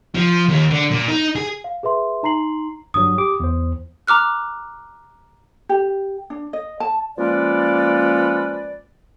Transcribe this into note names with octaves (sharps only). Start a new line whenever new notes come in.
F3
D#2
D3
A#2
D#4
G#4
F5
G#4 B4 E5 C6
D#4 A#5 C6 C7 F#7
G1 G2 F#3 D#6
G4 D6
E2 C5
A#5 D6 F6 F#6
G4
D4
D#5
A5
F3 G#3 A#3 C#4 B4 D5